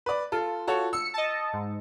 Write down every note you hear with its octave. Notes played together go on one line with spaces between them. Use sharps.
B4 D5
F4 A4
F#4 A4 C#5
E6 C#7
D#5 A5
G#2